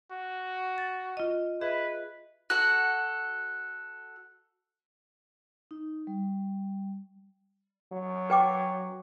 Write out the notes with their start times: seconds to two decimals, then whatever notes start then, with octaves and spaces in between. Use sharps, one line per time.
0.12 F#4
0.78 A6
1.17 F4 D#5
1.61 G#4 B4 D#5 E5
2.50 F#4 A4 F#5 F#6
5.71 D#4
6.07 G3
7.92 F#3
8.30 B4 G5 D6